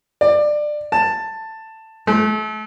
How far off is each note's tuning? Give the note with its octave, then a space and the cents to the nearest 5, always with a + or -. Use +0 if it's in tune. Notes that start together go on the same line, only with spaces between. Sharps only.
D5 +20
A5 +10
A3 -35